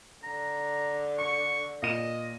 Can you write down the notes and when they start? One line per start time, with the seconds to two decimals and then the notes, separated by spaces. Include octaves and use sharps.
0.23 D3 A#5
1.19 C#6 C#7
1.82 A#2 D#5 D#7 E7